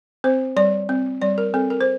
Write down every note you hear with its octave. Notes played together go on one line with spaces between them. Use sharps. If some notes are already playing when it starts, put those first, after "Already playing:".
C4 C5
G3 D5
C4
G3 D5
A#4
C4 A4
A#4
C5